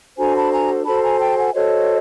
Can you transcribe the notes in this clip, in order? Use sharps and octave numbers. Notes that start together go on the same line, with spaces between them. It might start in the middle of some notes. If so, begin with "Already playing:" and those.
D4 F#4 A4 C5 G#5 A#5
A5 B5
G#5 A#5
F#4 A4 C5 A5 B5
G#5 A#5
G5 A5
F#5 G#5
F#4 A4 C5 C#5 D#5